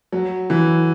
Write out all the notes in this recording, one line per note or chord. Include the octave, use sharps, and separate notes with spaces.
F#3
E3